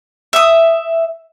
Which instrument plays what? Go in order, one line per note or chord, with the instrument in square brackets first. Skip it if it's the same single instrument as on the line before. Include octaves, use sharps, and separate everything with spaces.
[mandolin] E5 D#6